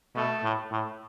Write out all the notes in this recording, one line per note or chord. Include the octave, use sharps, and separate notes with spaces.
B2 A3
A2
A2